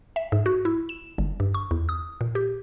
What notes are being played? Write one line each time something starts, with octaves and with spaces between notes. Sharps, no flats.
E5
G#2
F#4
E4
E7
G1
G2
C#6
E2
D#6
A#2
G4